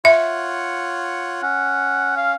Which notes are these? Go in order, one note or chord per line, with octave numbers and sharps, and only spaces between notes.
F4 C#5 E5 F#5
C#4 F#5
F5